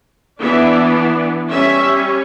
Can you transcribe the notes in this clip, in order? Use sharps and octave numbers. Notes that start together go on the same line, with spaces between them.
E3 B3 D4 E5
G3 C#4 E5